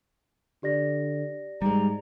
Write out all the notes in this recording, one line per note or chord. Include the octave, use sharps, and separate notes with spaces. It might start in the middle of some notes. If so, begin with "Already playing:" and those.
D3 G4 D5 A#6
G#2 G3 G#3 A#5